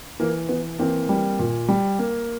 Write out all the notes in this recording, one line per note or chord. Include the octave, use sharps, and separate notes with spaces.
E3 A#3
E3 B3
E3 A#3 C4
G3
A#2
G3
A#3